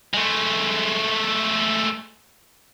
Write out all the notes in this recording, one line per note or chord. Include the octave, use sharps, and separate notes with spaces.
G#3 A3